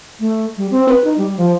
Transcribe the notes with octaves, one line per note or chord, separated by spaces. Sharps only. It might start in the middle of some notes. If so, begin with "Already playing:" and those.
A3
G3
C4
B4
D#4
G3
F3